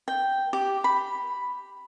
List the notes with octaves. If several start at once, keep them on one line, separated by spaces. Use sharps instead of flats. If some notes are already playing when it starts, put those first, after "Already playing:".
G5
G4
B5